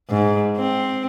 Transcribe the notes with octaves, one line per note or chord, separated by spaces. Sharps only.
G#2
C4